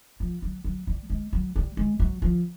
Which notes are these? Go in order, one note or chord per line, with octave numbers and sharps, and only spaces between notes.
F3
F#3
F#3
G3
G#3
F#3
G3
G#3
F#3
F3